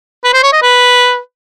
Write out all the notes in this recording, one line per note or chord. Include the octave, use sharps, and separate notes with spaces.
B4
C5
C#5
D#5
B4